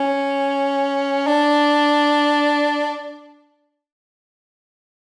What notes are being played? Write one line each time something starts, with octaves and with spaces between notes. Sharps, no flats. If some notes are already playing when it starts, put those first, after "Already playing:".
Already playing: C#4
D4